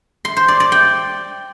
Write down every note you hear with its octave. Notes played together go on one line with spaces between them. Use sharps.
C6
C5
D5
D5
G5